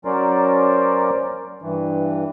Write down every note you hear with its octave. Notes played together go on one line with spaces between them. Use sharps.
F#3 C#4 A#4 C5 D5
G2 E3